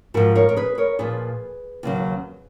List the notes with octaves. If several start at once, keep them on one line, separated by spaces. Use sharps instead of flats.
G#2 F3 F#4 A#4
A#4 C#5
A#4
G#4 B4
A#4 C#5
A#2 F3 G#4 B4
D#2 C#3 F#3